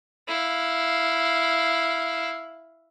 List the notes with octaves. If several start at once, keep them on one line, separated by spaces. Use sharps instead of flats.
E4 F5